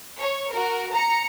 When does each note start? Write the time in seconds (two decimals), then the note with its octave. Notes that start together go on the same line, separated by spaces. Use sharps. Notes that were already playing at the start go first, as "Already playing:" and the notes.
0.18 C#5
0.50 F#4 A#4
0.92 A#5 C#7